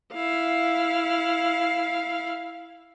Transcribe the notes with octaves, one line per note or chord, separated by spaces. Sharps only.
E4 F5